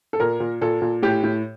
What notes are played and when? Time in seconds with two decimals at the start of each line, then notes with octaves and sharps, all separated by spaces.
0.13 A4
0.20 A#2 A#4
0.40 A#2
0.61 A#2 A4
0.82 A#2
1.02 A2 G4
1.23 A2